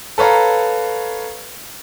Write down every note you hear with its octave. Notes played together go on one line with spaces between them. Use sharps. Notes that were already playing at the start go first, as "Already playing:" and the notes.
A4 B4 C#5 F5 A#5